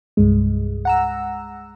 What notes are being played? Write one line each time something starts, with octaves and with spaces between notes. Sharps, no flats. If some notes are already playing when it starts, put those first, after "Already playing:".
C2 G2 G#3
F#5 A#5 E6